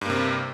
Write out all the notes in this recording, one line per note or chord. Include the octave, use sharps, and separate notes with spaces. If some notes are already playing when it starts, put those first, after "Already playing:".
G2 C3 A#3